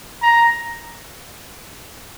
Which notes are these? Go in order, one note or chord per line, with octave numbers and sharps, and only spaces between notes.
A#5